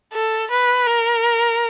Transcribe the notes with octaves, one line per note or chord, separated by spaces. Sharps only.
A4
B4
A#4